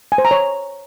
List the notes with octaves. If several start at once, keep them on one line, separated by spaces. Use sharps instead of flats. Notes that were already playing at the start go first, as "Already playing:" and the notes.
G#5
C5
A#5
C#5